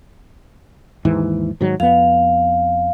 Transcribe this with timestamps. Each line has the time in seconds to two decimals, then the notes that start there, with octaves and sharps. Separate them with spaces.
1.05 D#2 G#2 E3
1.61 G#2 D#3 F#3
1.80 F2 B3 F5